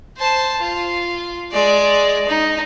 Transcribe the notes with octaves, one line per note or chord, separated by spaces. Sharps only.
C5 A5
F4
G#3 D5
D#4